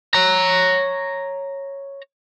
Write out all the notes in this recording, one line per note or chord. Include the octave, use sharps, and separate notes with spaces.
C#5 A#5